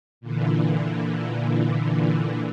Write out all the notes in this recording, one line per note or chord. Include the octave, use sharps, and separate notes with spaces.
A#2 D3 E3